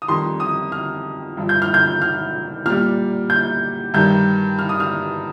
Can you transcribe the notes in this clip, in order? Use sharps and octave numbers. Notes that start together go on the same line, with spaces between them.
D#6
F2 D#3 G3 C6
D#6
F6
G2 F3
G6
F6
G6
F6
A#2 G3 F6
G6
G2 D#3 G3 G6
F6
D#6
F6